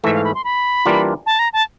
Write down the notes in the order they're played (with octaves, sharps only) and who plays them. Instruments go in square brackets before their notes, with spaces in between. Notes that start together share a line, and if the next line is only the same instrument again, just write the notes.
[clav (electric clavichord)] G#2 E3 A3 [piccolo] E5
[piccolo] F5
B5
C6
B5
[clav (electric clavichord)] E3 G3 A#3 D4 F4
[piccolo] A5
A#5
A5